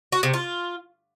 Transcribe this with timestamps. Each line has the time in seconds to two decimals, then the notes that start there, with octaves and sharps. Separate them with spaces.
0.12 F#4
0.23 C3
0.34 F4